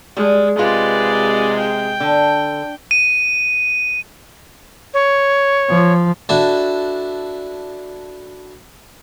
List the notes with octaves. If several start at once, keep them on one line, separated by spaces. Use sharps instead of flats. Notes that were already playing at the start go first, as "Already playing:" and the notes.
G3 G#3
C3 G#3 F4 B4 D5
G5
D3
D#7
C#5
F3
D4 E4 F#4 A4